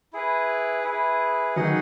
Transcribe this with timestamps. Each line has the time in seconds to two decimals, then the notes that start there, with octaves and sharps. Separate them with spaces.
0.13 E4 G#4 B4
0.84 E4 G#4 B4
1.56 D#3 F#3 D#4 G#4 D#5 F#5